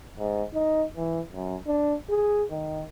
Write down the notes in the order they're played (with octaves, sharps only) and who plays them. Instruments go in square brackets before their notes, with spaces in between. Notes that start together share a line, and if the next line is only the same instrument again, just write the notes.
[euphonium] G#2
D#4
E3
F#2
D4
G#4
D#3